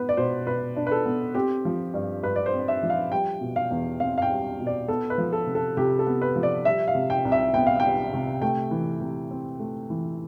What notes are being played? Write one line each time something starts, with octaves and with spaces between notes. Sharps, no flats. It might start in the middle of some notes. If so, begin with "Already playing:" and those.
Already playing: B3 B4
D5
B2 C5
B2 B4
D4
B4
A4
B3
C4 G4
F3
G2
G2 B4
D5
C5
C4
E5
F3
F5
G3 G5
B2
F5
E2
C4 F5
F5
G5
G3
B2
D5
B3 A4
B4
F3
A4
C3
A4
C3 G4
A4
B3
B4
F3
D5
G3 E5
F5
C3
G5
C2
E5
B3 G5
F5
G3 G5
C3
A3 G5
E3
C3
C4
A3
E3